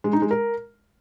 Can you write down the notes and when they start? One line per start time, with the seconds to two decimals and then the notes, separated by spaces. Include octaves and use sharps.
0.04 G#3
0.13 D#4
0.22 G#3
0.31 A#4